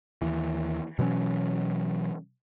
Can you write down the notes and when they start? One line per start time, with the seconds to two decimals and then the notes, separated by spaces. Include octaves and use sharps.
0.22 D#2 E3
0.99 B2 E3 F#3 C#4